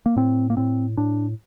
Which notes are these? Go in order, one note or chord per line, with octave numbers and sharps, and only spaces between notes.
A#3
A2 C4
A#3
A2 C4
A2 D4